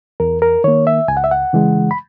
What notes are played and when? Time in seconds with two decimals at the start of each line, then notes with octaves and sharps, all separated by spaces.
0.20 E2 A#4
0.42 A#4
0.64 D#3 A#3 C#5
0.87 E5
1.08 C#2 G#5
1.17 F#5
1.24 E5
1.31 F#5
1.53 C#3 E3 G#3
1.91 B5